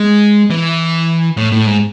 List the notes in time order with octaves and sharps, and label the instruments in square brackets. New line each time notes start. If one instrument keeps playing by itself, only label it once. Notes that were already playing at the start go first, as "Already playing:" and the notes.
Already playing: [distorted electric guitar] G#3
E3
A2
A2
G#2